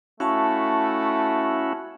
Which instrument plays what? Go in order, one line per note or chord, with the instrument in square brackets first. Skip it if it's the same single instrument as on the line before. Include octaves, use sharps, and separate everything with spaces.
[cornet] A3 [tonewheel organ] C#4 E4 F#4 [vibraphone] F5 A5 C#6